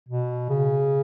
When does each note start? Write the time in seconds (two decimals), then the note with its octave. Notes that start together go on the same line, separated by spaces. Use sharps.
0.09 B2
0.49 C#3